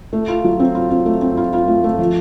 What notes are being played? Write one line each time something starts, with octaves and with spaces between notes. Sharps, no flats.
A3
F4
F#3
C4
F4
C4
A3
C4
F4
F4
A3
A3
F3